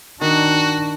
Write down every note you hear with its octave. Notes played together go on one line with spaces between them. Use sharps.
D#3 D4 F#4